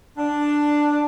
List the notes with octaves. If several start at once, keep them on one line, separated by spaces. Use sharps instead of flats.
D4